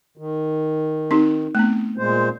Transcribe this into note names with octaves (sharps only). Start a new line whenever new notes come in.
D#3
C4 D#4 G4
A3 B3 C4
A#2 G#3 C5